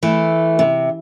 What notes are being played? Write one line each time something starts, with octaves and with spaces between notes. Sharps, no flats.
E3 A3
C3